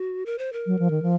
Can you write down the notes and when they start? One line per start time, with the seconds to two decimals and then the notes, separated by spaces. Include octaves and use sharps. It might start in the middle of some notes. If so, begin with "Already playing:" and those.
Already playing: F#4
0.26 A#4
0.38 C5
0.53 A#4
0.66 F#3
0.79 F3
0.91 D#3
1.02 F3